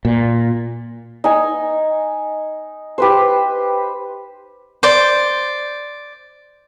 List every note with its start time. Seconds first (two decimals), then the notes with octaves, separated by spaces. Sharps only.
0.05 A#2
1.24 D#4 G#5
2.98 G4 B4 C5
4.83 C5 D5